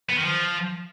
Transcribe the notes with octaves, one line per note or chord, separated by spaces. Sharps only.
B3
D#3
F3